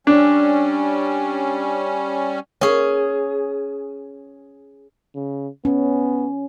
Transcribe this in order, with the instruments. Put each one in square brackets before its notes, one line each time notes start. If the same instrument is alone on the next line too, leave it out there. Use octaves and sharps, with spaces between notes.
[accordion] G3 C#4 [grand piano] D4
[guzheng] C#4 G#4
[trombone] C#3
[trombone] B3 [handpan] C#4